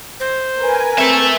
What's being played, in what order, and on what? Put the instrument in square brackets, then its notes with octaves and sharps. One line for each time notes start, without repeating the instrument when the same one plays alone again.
[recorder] C5
[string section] A#4 B4 G#5
[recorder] C4 [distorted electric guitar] A4 E5